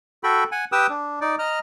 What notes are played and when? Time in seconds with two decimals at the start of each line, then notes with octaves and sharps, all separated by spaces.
0.24 F#4 A4 G5 B5
0.52 F#5 G#5
0.72 G4 B4 G5 D#6 E6
0.89 D4
1.21 D#4 D5
1.39 D#5 A#5 F6